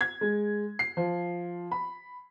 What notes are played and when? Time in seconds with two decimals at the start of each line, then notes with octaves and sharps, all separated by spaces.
0.01 G#6
0.21 G#3
0.79 C7
0.97 F3
1.71 B5